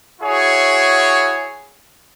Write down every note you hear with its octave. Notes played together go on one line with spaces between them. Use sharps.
E4 F#4 G#4 C#5